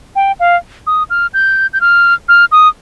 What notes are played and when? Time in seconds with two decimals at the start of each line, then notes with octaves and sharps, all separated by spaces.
0.15 G5
0.40 F5
0.87 D#6
1.10 F6
1.34 G6
1.73 G6
1.81 F6
2.28 F6
2.52 D#6